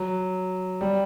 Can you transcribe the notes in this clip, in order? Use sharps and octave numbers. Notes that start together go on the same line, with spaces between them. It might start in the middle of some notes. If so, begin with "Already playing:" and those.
Already playing: F#3
G3